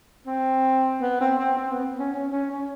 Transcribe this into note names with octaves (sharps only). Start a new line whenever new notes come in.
C4
B3
C4
C4
C4
B3
C#4
C#4
C#4
C#4